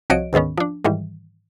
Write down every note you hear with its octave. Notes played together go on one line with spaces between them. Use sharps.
C2 F3 F#4 C#5 D#5 D7
D2 G#2 D#3 B3 C#4
F3 D4
G#2 D#3 E3 G3